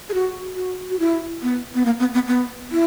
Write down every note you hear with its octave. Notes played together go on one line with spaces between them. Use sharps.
G#4
F#4
F#4
F#4
E4
B3
B3
A#3
B3
B3
B3
E4